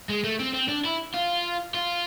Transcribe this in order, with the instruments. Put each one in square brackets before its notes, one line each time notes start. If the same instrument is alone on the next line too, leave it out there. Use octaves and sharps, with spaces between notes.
[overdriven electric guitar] G#3
A3
C4
C4
D4
E4
F4
F4